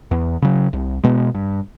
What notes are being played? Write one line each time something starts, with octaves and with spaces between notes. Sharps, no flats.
E2
C#3 F#3
C2
B2 G#3 B3
G2